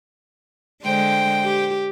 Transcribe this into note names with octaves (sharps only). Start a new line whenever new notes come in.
D3 G#3 C5 G5
G4